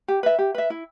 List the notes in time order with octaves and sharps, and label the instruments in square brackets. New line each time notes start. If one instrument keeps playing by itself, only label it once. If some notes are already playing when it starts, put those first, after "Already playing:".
[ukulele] G4
B4 E5
G4
B4 E5
E4